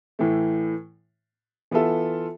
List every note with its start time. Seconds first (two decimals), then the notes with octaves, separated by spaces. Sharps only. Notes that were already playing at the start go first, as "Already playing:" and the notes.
0.19 A2 E3 A3
1.71 E3 B3 F4 A4 E5